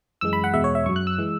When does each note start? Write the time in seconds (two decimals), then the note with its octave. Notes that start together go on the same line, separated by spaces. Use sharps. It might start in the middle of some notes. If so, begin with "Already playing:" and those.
0.21 F#2 E3 G#3 E6
0.33 B5
0.44 F#5
0.54 E2 B2 G#3 E5
0.64 C#5
0.75 E5
0.86 F#2 C#6
0.89 F#3
0.96 F#6
1.07 E6
1.18 E3 G#3